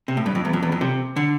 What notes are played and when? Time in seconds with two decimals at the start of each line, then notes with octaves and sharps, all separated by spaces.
0.08 C3
0.17 A2
0.26 G2
0.35 F2
0.45 E2
0.53 F2
0.63 E2
0.72 F2
0.81 C3
1.16 D3